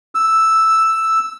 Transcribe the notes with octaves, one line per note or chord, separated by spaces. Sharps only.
E6